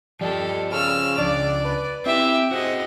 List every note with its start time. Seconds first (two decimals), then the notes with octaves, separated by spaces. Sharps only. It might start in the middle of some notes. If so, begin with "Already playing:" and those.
0.21 F3 G3 A4 D#5
0.73 C#3 E6 F6
1.18 C#2 D4 D5
1.64 B4
2.06 C4 E4 G4 E5
2.51 C4 F#4 G#4 D#5 F#5